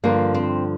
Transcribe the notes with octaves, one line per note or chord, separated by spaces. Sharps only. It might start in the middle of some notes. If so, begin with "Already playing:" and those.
G2 D3 F3 A#3
C4